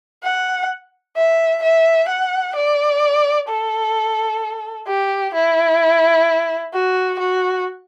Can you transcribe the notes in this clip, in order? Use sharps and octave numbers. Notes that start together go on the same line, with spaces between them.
F#5
E5
E5
F#5
D5
A4
G4
E4
F#4
F#4